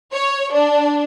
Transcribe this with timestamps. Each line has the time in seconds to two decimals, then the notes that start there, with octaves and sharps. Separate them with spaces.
0.13 C#5
0.53 D4